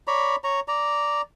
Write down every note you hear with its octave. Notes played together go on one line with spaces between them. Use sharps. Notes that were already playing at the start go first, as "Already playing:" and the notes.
C#5 D5 A#5 B5
C#5 A#5
D5 A#5